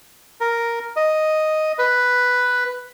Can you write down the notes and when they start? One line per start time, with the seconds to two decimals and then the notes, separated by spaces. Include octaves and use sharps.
0.41 A#4
0.96 D#5
1.79 B4